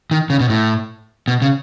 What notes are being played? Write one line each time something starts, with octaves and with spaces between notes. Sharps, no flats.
D#3
C#3
B2
A2
B2
C#3